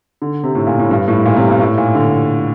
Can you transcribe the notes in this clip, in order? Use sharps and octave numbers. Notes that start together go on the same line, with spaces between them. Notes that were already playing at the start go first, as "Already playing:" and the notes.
D3
C3
A2
A#2
A2
G2
A2
A#2
C3
G2
A2
A#2
D3